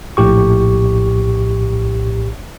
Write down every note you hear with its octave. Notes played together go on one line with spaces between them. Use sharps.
A#1 A2 G4 C#6